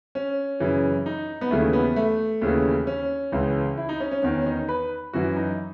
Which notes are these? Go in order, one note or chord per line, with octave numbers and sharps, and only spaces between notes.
C#4
F#2 C#3 E3
D#4
B3
D#2 C#3 E3 A3
B3
A3
D#2 C#3 E3
C#4
C#2 C#3 E3
E4
D#4
C#4
C#4
E2 D#3 C#4
C#4
D#4
B4
F#2 E3 F#4
D#4